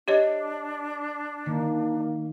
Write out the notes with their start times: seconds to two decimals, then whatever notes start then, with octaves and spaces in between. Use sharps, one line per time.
0.08 D4 G4 C#5 D#5
1.46 D#3 A#3